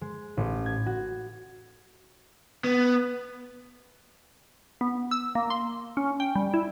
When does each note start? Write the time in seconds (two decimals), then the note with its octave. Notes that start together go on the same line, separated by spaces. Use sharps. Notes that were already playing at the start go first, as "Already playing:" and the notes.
0.01 G#3
0.37 A1
0.66 G#6
0.86 F#4
2.65 B3
4.81 B3
5.11 E6
5.35 A#3
5.50 C6
5.97 C#4
6.20 G5
6.36 G3
6.54 E4